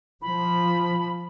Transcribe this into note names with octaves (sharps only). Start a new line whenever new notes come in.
F3 B5